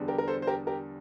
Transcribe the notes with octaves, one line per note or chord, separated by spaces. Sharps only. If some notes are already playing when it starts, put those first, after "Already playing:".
Already playing: E2 D3 G3
G4 A#4
A#4
A4 C5
C5
G4 A#4
G4 A#4